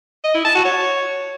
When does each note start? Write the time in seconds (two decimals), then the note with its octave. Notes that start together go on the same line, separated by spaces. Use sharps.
0.24 D#5
0.34 E4
0.45 A5
0.55 F#4
0.65 C#5